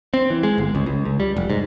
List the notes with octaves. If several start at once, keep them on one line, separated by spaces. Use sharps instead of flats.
C4
E3
G#3
G1
C#2
C#2
C#2
G3
F1
G#2